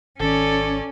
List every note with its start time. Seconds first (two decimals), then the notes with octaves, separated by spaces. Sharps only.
0.20 G#1 D#3 C#4 A4 D5